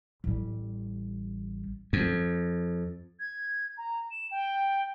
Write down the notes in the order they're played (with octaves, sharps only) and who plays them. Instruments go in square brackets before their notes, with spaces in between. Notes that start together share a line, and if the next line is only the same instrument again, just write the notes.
[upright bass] A1 G3
[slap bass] F2
[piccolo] G#6
A#5
E7
G5